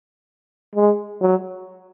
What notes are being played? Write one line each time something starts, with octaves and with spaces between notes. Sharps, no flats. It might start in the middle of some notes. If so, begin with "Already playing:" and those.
G#3
F#3